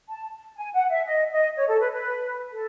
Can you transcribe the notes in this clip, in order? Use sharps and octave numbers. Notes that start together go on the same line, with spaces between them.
A5
G#5
F#5
E5
D#5
D#5
C#5
A4
B4
B4
A4